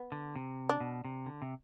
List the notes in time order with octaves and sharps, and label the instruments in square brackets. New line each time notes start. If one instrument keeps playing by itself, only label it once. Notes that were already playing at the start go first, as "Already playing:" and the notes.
Already playing: [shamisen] B3
[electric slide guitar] D3
C3
[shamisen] D4
[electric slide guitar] B2
C3
D3
C3